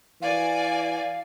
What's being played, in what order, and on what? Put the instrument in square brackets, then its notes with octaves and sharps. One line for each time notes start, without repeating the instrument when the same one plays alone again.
[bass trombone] E3 [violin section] F#4 D5 G#5 [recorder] F5